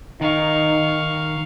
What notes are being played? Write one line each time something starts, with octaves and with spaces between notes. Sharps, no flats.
D#3 D#4 F5 C#6